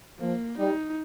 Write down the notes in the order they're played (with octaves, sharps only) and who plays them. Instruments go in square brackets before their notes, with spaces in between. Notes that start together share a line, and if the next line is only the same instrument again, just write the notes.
[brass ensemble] F3 [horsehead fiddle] A#3
[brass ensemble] G3 [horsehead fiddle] D#4